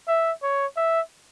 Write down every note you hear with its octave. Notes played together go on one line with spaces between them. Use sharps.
E5
C#5
E5